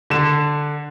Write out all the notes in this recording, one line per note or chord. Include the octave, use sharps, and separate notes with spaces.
D3 E7